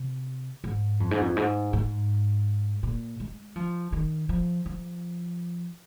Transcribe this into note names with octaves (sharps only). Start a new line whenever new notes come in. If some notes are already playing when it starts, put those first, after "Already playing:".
Already playing: C3
G#2
F2
G#2
F2
G#2
G#2
A#2
G#3
F3
D#3
F3
F3